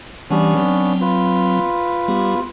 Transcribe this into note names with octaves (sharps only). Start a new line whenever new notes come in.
E3 G3 B3 C#4 D4 G4
F#3 C4
F4 B4
G3 B3 G4